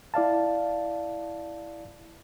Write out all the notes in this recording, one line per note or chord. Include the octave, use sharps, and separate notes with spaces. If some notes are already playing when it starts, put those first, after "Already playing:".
E4 D5 F5 A5